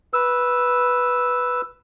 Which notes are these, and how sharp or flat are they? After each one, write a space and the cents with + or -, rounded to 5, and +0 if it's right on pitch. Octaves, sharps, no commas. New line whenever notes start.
B4 -5 E6 +0